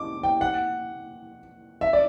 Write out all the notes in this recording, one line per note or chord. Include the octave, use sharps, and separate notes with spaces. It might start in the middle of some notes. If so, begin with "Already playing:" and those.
Already playing: D6
G5
F#5
E5
D5